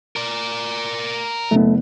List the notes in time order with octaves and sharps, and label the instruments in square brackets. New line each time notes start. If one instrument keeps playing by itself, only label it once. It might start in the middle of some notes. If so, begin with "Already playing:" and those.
[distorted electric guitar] A#4 D5
[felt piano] F#1 B3 [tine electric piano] A3